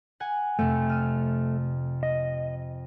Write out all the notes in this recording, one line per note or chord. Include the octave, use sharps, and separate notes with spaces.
F#5 G#5
F2 C3 A3
F6 D#7
D#5